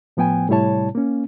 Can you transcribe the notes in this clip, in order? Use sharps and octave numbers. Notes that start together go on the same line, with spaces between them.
A2 F3 B3 G5 G#5
A2 C3 G3 E4 C#5 A5
A#3 C#4